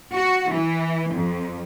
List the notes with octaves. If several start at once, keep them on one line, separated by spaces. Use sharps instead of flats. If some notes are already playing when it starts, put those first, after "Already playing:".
F#4
E3
F2